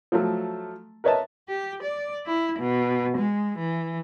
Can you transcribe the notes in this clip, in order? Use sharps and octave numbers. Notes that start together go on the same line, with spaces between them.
F3 F#3 A3
A#4 B4 C#5 D#5 E5 A5
G4
D5
E4
B2
G#3
E3